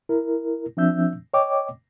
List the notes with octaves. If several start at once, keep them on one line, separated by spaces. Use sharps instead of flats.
E4 A#4
F3 C4 D4 E5 E6 G6
C#5 D#5 G5 D6